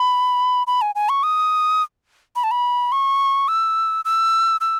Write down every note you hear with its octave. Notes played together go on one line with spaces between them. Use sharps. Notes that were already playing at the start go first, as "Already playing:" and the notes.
Already playing: B5
B5
G#5
G#5
C#6
D#6
B5
A5
B5
C#6
E6
E6
E6